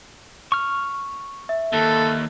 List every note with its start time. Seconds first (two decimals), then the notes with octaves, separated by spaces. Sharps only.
0.52 C#6 F6
1.49 E5
1.73 D#2 A4